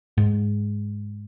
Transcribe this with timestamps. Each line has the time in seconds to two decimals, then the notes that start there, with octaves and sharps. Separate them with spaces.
0.18 G#2